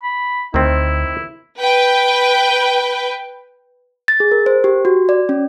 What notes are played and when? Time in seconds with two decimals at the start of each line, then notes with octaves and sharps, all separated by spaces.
0.03 B5
0.54 D2 D#3 C4 E4
1.58 B4 G5
4.08 A6
4.20 G#4
4.32 A#4
4.46 C5
4.64 G4
4.85 F#4
5.09 D5
5.29 C#4